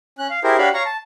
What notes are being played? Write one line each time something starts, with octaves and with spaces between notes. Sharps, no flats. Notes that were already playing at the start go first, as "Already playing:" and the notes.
C#4 F#6
F5
E4 G4 G#4 A#4 C5
D4 F#4 G4 C#5 F5 B5
C#5 F5 A#5 C#6
A5